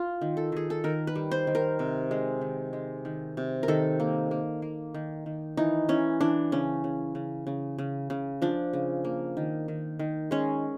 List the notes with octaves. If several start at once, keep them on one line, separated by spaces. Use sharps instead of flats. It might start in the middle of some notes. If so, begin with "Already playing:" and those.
Already playing: F4
D#3
A4
D#3 G#4
A4
D#3 A#4
B4
G3
C5
D#3
A#4
C3
G#3
D#3
G#3
D#3
C3
A#4
D#3 A4
A#3
A#3
A#3
D#3
D#3
E3 D#4
E3 C#4
E3 D4
C#3 C#4
C#3
C#3
C#3
C#3
C#3
F3 D4
C#3
A#3
D#3
D#3
D#3
G#3 C#4